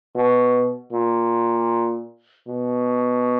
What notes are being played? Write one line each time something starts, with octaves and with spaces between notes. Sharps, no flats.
B2
A#2
B2